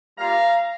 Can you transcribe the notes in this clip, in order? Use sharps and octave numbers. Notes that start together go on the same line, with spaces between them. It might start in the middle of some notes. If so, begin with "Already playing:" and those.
G3 A#3 F4 F5 A#5